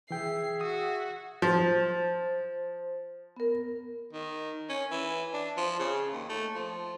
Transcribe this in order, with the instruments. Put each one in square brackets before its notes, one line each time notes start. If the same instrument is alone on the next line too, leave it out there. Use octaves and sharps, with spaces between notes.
[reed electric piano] E3 G5 [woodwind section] G#4 E5 [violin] C7
[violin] F#4 [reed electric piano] D#6
[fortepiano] F3 [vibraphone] C5
[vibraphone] B3 A#4
[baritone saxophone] D#3
C#4
E3
D4
F3
C#3
D#2
A3
F3